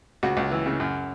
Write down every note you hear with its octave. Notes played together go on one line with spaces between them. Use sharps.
C#2 F#4
C#2
E3
C#3
F#2